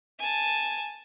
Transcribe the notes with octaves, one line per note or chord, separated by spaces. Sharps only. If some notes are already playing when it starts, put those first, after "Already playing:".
G#5 A5